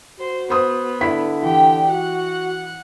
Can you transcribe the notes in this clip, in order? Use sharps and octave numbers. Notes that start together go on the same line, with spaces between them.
F#4 C5
B3 C5 D#6
D3 E4 B5 B6
E3 G4 G5
F#4 F#5